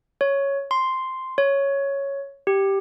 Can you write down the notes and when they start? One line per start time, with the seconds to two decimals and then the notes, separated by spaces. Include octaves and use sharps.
0.21 C#5
0.71 C6
1.38 C#5
2.47 G4